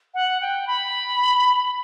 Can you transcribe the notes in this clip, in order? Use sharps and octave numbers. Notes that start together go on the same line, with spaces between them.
F#5
G5
B5